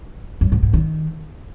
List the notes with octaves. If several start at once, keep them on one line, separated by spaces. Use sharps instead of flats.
F#2
G#2
G#2
D#3